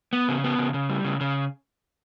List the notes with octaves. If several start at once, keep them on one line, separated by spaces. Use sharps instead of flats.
B3
C#3
B3
C#3
C#3
G3
C#3
C#3